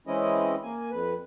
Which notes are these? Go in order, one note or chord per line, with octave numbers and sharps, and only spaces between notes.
E3 G#3 C4 C#4 E4 D#5
A#3 G#5
F2 B4